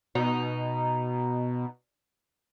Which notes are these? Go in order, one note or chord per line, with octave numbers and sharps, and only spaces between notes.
B2 D#4